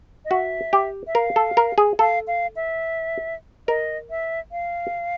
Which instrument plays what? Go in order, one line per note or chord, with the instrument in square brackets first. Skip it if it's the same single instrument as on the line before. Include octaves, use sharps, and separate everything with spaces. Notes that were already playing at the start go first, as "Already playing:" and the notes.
[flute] D#5
[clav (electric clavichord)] F#4 [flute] E5
[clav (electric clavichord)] G4
[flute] E5
[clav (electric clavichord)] A#4 [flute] F5
[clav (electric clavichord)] A4
A#4
G#4
[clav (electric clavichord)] A4 [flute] F5
[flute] F5
E5
[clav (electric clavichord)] A#4 [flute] D#5
[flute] E5
F5